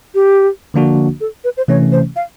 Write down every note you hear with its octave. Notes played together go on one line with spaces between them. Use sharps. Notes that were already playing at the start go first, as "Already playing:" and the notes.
G4
D3 F3 A#3 D4 F#4
A4
B4
C5
C3 E3 A3 C#4 C#5
C5
F5